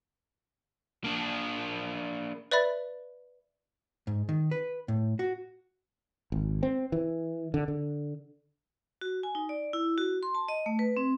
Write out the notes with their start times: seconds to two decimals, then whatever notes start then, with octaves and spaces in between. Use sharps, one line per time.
1.04 A#3 D4
2.51 B4 D5 E5 B5 A6
4.07 G#2
4.29 D#3
4.51 B4
4.88 A2
5.19 F#4
6.32 G#1
6.63 C4
6.92 E3
7.54 D3
7.68 D3
9.01 F#4
9.23 G#5
9.35 D#4
9.49 D5
9.73 E4
9.98 F#4
10.23 C6
10.35 A5
10.48 D#5
10.66 A3
10.79 B4
10.97 C4